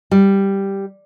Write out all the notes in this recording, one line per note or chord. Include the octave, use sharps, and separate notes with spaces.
G3